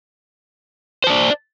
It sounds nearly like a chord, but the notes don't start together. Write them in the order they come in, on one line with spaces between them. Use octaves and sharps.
C5 A5 D5